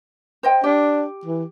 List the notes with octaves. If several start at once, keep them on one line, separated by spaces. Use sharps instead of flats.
C5 D#5 G5
D4 G4
E3